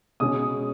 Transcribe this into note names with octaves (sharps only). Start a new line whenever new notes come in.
B2 G#3 C#4 D#6